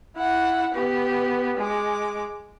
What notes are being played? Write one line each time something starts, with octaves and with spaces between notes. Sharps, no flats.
E4 F#5
B3 G4
G#3 D6